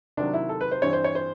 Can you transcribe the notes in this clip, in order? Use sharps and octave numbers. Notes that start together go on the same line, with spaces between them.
C3 D#3 F#3 D4
E4
A4
B4
C5
G2 E3 G3 C4 C#5
C5
C#5
C5